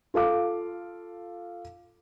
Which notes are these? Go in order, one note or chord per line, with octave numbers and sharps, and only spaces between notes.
F4 A4 F5 D6